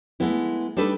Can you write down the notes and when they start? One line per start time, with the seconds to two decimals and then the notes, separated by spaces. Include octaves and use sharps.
0.20 G#3 A3 B3 E4
0.77 G3 D4 D#4 A4 B4